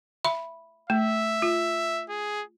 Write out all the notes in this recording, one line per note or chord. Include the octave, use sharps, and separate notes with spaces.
E5 B5 C6
A3 E5
F4
G#4